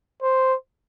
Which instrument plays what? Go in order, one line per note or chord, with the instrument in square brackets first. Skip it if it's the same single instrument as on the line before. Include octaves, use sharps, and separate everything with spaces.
[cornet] C5